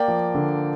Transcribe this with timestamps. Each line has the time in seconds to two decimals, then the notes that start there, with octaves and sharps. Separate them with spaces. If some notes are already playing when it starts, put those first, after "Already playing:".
Already playing: A#3 D5 G5
0.08 F3
0.35 D3